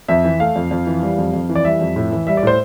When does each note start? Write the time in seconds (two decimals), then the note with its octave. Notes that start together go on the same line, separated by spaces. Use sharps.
0.08 F2 E5
0.24 E3
0.40 A3 F5
0.56 F2
0.71 F2
0.87 E3
1.02 G3
1.18 F2
1.33 F2
1.49 E3
1.55 D5
1.65 G3 E5
1.81 F2
1.96 A2
2.12 E3
2.27 G3 E5
2.37 D5
2.43 A2 C5